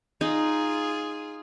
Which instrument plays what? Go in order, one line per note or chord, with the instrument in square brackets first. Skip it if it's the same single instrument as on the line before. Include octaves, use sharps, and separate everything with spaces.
[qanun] D#4 [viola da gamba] F4 G#4